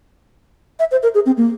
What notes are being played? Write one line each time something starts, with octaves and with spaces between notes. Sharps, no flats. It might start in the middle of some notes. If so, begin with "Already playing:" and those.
E5
C5
A#4
G#4
C4
A#3